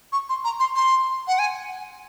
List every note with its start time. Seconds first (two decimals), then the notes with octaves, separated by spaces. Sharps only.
0.12 C#6
0.29 C6
0.44 A#5
0.60 C6
0.76 C6
1.28 F#5
1.39 G#5